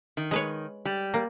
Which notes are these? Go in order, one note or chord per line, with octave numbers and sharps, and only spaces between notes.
D#3
G#3 B4 C#5
G3
A#3